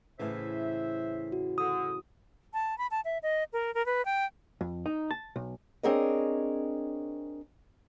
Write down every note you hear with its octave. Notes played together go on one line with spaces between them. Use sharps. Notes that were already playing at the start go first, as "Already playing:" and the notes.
A2 C#3 E3 C5 E5
F#4
D3 D#6
A5
B5
A5
E5
D#5
A#4
A#4
B4
G5
F2
D#4
A5
B1
C4 D4 G#4 A#4 C#5 D#5